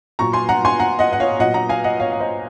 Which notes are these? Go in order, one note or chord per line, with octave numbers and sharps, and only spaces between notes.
A#2 F#3 A#5 C#6
G#5 C6
F#5 A#5
G#5 C6
F#5 A#5
D#5 F#5
F#5
C#5 F5
A#2 F#3 D#5 F#5
F#5 A#5
F5 G#5
D#5 F#5
C#5 F5
F5
C5 D#5